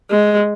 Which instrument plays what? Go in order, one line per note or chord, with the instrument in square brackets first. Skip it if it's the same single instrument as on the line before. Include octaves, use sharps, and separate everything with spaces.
[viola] G#3